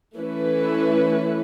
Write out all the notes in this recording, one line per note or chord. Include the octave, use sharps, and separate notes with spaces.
E3 A3 C#4 E4 B4